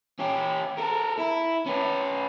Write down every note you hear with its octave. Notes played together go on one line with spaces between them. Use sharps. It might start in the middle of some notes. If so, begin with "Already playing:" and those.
C#4 G4
A4 A#4
E4
C#4 B4